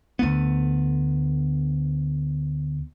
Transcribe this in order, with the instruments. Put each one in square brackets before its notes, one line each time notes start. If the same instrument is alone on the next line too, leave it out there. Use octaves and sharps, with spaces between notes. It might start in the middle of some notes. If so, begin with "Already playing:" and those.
[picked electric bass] D2 A3 B3